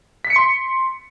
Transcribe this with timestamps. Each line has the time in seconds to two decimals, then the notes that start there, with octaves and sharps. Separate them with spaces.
0.25 B6
0.30 C#7
0.36 C6